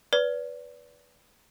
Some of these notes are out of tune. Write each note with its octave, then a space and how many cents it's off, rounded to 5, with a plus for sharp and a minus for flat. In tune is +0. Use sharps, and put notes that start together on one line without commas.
B4 +0 D5 -25